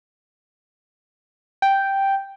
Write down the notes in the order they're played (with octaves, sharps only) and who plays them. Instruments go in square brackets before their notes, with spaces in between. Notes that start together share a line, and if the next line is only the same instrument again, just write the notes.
[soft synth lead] G5